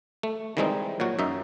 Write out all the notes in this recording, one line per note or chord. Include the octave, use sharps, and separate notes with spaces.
A3
D#3 E3 G3 G#3 C4 D#4
A#2 F#3 F#4
F#2 D#4 E5